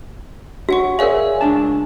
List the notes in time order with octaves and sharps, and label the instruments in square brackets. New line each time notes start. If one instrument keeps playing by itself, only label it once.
[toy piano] F#4 [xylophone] C#5 F#5 C#6
[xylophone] G#4 D5 E5 [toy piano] A#4 C#5 F5 [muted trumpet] G#5
[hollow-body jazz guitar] C#2 D4 A5